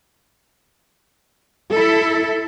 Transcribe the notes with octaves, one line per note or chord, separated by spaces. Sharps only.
E4 A4